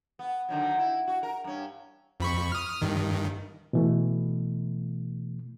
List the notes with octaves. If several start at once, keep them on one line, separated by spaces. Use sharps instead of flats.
B3
D3 D#3 F#3
E4
F#4
A#4
G2 C#4
F2 B5 C#6
D#6 F6
G2 D#3
B2 E3 A3